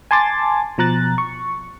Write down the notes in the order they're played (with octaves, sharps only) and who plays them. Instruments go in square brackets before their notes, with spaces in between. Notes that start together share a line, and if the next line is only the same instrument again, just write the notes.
[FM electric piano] G#5 A5 C6 D6 A6
B2 F3 A#5 F#6 A6
C#6